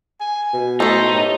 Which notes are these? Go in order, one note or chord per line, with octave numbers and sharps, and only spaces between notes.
G#5
B2
A3 D#4 A4 C5
A2 G4